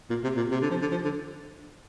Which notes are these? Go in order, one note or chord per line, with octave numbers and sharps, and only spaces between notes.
A#2
C3
A#2
C3
D3
F3
D3
F3
D3